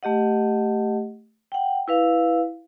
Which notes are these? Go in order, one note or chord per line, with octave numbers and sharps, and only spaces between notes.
A3 G4 D#5 F#5
F#5 G5
E4 B4 F5